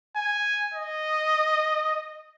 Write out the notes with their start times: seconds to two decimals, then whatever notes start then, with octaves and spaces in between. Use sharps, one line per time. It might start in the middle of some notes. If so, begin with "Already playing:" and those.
0.16 G#5
0.74 D#5